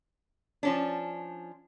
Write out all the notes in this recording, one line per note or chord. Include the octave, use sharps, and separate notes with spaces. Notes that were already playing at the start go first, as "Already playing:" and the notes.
F3 C#4 D4